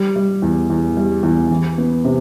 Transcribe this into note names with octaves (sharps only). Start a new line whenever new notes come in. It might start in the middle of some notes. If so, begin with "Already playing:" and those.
Already playing: G3
G3
E2
E2
G3
E2
E3
B3
C3